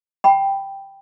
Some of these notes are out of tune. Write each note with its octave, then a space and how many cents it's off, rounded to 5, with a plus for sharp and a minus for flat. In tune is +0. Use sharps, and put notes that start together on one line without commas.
G5 +0 B5 +0